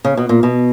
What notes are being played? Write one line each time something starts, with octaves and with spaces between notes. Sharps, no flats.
C#3
B2
A#2
B2